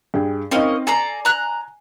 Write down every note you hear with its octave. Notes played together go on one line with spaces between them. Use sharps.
G2 G#4 G5
A#3 C4 C#4 D#4 D#5
A4 D5 G#5 A#5 C7
A#5 F#6